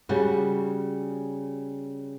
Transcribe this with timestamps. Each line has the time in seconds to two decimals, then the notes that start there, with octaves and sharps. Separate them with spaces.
0.09 C#3 G3 F#4